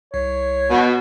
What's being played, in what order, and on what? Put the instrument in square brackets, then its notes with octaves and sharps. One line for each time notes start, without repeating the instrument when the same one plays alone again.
[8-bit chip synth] C2 [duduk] C#5
[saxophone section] B2